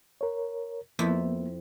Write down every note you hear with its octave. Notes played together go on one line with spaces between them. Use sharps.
A#4 C#5
F2 A#3 B3 E4